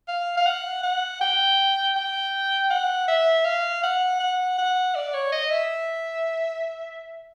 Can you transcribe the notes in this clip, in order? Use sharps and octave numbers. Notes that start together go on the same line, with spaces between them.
F5
F5
F#5
F#5
G5
G5
F#5
E5
F5
F#5
F#5
F#5
D5
C#5
D#5
E5